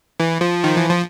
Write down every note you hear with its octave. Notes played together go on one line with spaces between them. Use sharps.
E3
F3
D#3
E3
F3